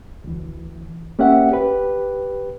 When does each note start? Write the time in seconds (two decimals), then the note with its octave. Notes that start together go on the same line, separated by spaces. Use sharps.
0.24 D2 E3
1.19 A#3 C#4 G4 E5 F#5
1.51 G4 B4